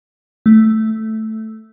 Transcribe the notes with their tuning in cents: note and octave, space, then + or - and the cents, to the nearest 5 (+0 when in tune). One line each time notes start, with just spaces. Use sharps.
A3 -5